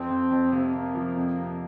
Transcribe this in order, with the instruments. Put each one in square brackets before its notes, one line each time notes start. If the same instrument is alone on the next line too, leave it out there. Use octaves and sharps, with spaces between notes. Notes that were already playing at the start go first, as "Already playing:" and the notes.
Already playing: [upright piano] F2 [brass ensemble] C4
[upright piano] F2
F2
[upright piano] C3 [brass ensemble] A#3
[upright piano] C3
F3
F2
C3